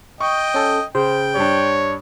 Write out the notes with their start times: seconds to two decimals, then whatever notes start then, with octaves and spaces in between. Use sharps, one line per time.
0.21 D#5 G5 C#6
0.54 C#4 A4
0.95 C#3 C5 G5
1.36 G2 D4 C#5